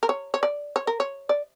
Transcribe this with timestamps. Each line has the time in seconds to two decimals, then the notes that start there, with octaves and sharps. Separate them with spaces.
0.03 A#4
0.09 C#5
0.34 C#5
0.43 D5
0.76 C#5
0.87 A#4
1.00 C#5
1.29 D5